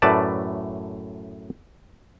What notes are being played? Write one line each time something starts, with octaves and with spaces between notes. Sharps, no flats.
F#2 A2 A3 B4 D5 A5